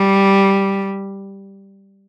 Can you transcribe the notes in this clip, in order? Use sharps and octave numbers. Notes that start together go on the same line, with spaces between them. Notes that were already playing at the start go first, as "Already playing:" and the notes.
Already playing: G3